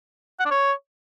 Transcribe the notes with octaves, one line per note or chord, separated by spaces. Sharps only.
F#5
D4
C#5